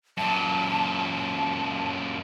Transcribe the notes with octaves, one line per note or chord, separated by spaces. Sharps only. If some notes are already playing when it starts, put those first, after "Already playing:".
F#2 A#2 A5